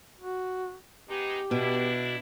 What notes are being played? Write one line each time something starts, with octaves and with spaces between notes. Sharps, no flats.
F#4
G#3 B3 D#4 G4
B2 D4 E4